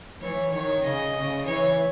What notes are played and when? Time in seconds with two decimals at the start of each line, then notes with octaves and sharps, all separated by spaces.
0.21 E3 C#5
0.52 D#3 C#5
0.84 C#3 D#5
1.15 C#3
1.46 E3 C#5